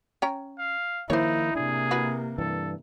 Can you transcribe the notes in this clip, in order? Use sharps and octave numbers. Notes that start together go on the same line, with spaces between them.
C#4 G5 A#5
F5
D#3 F3 A#3 D#4 E4 C5 C#5
C3 A#3 D4 G#4
E4 F#4 B4
G2 E3 A4